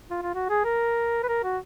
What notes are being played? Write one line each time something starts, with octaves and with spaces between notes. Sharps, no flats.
F4
F4
F#4
G#4
A#4
B4
A#4
F#4